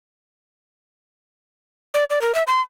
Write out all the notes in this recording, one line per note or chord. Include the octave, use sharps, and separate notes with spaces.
D5
D5
A#4
E5
C6